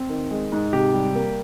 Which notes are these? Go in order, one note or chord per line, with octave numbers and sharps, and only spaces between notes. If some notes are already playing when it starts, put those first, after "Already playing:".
Already playing: C4
D#3
G#3
G#2
C3 G4
G3
A#3